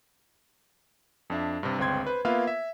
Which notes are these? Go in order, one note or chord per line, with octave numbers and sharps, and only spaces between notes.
F2 D4 E5
G2 C3
G1 C#2 C4 G5 C6 G#6
B4 C5
A#3 B3 F4 B4 E5 F5
E5